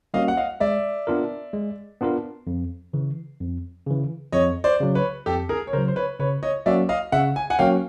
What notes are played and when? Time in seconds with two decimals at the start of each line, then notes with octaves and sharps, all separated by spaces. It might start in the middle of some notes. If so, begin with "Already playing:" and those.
0.14 G3 A#3 C#4 F#4 D#5 F5
0.28 F#5
0.37 D#5 F5
0.60 G#3 D5 E5
1.07 B3 D4 F4 A#4
1.53 G#3
2.01 B3 D4 F4 A#4
2.47 F2
2.93 C#3 E3
3.40 F2
3.86 C#3 E3
4.32 F2 C#5 D#5
4.64 C5 D5
4.80 C#3 F#3
4.95 B4 C#5
5.26 F2 G4 A4
5.49 G#4 A#4
5.67 C#5
5.73 C#3 F#3 A#4 C5
5.88 C5
5.96 B4 C#5
6.19 C#3 B4 C#5
6.43 C#5 D#5
6.66 F#3 A#3 C#4 F#4 D5 E5
6.89 D#5 F5
7.12 C#3 E5 F#5
7.36 G#5
7.50 F#5 G#5
7.59 F#3 A#3 C#4 F#4 F5 G5